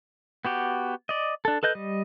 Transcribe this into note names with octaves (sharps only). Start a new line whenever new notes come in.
B3 F#4 G4
D5 D#5
D4 A4
A4 B4 D#5 G6
G3 D#5